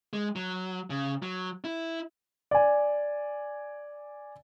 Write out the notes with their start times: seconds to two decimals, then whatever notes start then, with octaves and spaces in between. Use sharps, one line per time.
0.13 G#3
0.36 F#3
0.90 C#3
1.22 F#3
1.64 E4
2.51 D5 G#5